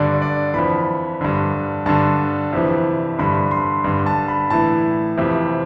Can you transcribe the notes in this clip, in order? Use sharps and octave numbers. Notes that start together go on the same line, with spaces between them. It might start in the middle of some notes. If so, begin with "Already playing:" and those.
Already playing: G2 D3 D5
D5
F2 E3 B5
G2 D3
G2 D3 A5
F2 C3 E3
G2 D3 B5
C6
G2 D3
A5
B5
A2 E3 A5
F2 C3 E3